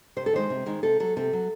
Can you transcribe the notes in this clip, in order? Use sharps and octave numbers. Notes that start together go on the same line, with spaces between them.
C3 C5
A4
D#3 G#3 C5
C3
D#3 G#3
C3 A4
F#3 A4
C3 A4
F#3